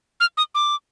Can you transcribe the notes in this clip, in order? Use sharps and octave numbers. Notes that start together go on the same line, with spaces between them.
F6
D#6
D6